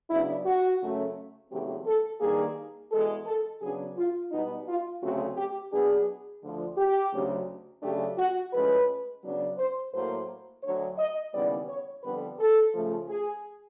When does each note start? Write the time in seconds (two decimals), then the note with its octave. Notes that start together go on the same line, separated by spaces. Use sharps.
0.10 C#3 F#3 B3 D4 E4
0.45 F#4
0.81 F#2 C#3 F#3 A3 C#4
1.51 E2 C#3 F#3 A3 C4 G4
1.87 A4
2.21 G2 D#3 G3 A#3 G#4
2.91 E2 B2 G#3 A4
3.26 A4
3.61 C#3 F#3 B3 D4 G#4
3.97 F4
4.31 B2 G3 B3 D#4
4.67 F4
5.02 D2 C#3 F#3 A3 C4 F#4
5.37 G4
5.72 B2 F#3 B3 D4 G#4
6.42 D2 D3 F3
6.77 G4
7.13 D2 C#3 F#3
7.83 C#3 F#3 A3 D4 G4
8.17 F#4
8.53 A2 F3 G#3 C#4 B4
9.23 C#3 F#3 B3 D4
9.58 C5
9.93 A2 F#3 A#3 C5
10.63 D2 D3 F#3 C#5
10.99 D#5
11.33 D#2 C#3 E3 G3 B3 D5
11.69 C#5
12.04 F2 D3 G3 B3 B4
12.39 A4
12.74 C#3 F3 A3
13.09 G#4